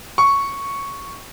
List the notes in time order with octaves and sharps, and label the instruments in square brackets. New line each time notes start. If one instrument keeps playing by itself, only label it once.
[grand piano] C#6